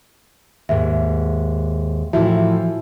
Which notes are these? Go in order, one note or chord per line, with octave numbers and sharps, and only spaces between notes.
D#2 G#2 E5
A2 E3 F3 E4 F#4 E5